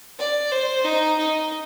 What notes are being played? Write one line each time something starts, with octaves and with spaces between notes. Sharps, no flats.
D5
C5
D#4
D#4